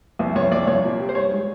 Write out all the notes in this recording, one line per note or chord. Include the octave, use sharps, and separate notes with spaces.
C2
C2 C#5
C2 D5
C2 C#5
A#2
G3
C5
G2 C#5
G#3